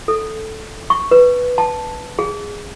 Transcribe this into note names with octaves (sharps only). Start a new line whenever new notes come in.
A4
C#6
B4
A5
G#4